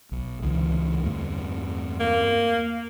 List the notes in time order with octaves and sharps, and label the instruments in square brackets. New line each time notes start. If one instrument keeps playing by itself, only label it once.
[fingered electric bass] B1
C#2 D3 E3
E2 G2 A3
[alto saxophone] A#3